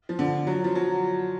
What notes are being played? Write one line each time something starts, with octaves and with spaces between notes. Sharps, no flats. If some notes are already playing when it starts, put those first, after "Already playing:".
F3
D3
F#3
F3
F#3